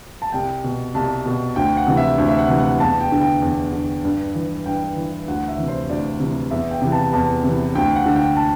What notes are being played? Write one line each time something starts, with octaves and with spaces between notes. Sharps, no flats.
A5
C2 G5
B2
C2 A5
B2
D2 G5
F#5
C3 E3
E5
D2
E5
F#5
C3 E3
F#5
E2 A5
G5
D3
G5
E2
D3
G2
E3
G2 G5
E3
D2 F#5
E5
C3 E3
C5
D2 D5
C3 E3
E2 E5
G5
C3 E3
A5
E2 A5
C3
E3
D2 G5
F#5
D3
G5
A5